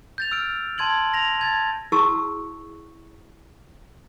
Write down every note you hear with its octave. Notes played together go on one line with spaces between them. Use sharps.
G6 A6 F7
E6 F6 D7
A5 C6 G#6 D7 F#7
A#6 F7
A5 G#6 A6
E4 F#4 G#4 A5 C#6 E6